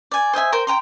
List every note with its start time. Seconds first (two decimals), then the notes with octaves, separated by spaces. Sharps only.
0.12 D5 G#5
0.33 C5 D#5 E5 G#5
0.52 A#4 C5 G5 C6
0.67 G5 G#5 A#5 C6